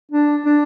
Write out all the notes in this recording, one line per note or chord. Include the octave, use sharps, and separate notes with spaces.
D4
D4